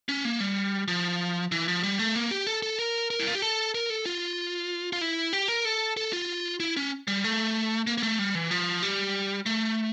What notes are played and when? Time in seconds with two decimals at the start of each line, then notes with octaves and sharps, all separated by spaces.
0.09 C#4
0.25 A#3
0.40 G3
0.88 F3
1.52 E3
1.68 F3
1.83 G3
1.99 A3
2.16 A#3
2.31 G4
2.47 A4
2.63 A4
2.79 A#4
3.10 A#4
3.19 E4
3.27 F4
3.35 G4
3.42 A4
3.75 A#4
3.90 A4
4.06 F4
4.93 F4
5.01 E4
5.33 G4
5.48 A#4
5.65 A4
5.97 A4
6.13 F4
6.60 E4
6.77 C#4
7.08 G3
7.24 A3
7.87 A#3
7.98 A#3
8.03 A3
8.19 G3
8.35 E3
8.51 F3
8.83 G3
9.46 A3